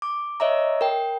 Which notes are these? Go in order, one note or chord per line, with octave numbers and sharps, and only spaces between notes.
D6
C#5 D#5 E5 A#5
A#4 G5